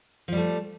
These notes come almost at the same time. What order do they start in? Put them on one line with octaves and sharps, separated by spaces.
F3 G3 A3